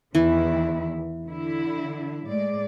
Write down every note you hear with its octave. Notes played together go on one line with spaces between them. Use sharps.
E2 D#3 E3 E4
D3 E4
A2 G#3 D5